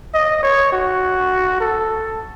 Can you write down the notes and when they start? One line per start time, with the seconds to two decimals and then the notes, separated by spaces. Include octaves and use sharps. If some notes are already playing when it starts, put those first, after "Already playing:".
0.14 D#5
0.43 C#5
0.73 F#4
1.60 A4